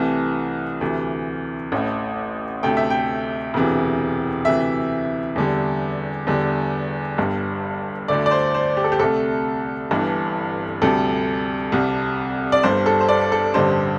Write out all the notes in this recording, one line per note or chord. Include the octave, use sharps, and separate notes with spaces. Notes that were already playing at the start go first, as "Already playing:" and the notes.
Already playing: C2 C3 E3 A3
D2 C3 E3
A1 A2 A3
D2 C3 A3 G5
E5
G5
E1 D2 C3 E3
D2 C3 E3 E5
E2 D3 G3
E2 D3 G3
G1 G2 G3
D2 D3 A3 D5
D5
C5
C5
G4
A4
G4
C2 C3 A3 A4
G1 G2 E3
D2 C3 G3 A4
C2 C3 G3
D5
G1 G2 G3 C5
A4
C5
D5
A4
A1 G2 D3 G3 C5